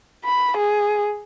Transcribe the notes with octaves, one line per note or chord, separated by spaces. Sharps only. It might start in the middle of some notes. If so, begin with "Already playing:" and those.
B5
G#4